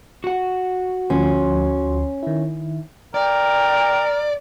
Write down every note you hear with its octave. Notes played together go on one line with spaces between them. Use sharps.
F#4 F#5
D2 F3 C#4 C6
D#3 E4
A#4 D5 G5